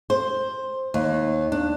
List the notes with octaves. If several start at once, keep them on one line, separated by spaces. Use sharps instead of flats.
C5
D#2
D4